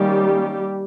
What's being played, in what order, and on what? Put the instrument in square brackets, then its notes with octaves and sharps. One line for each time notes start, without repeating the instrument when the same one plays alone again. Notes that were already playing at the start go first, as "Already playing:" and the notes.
Already playing: [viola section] D#3 G3 A#3 C#4 G4